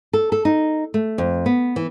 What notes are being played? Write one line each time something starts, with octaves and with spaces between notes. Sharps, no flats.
A4
A4
D#4
A3
F2
B3
E3